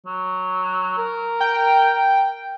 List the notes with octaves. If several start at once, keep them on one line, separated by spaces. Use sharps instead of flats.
F#3
A#4
G5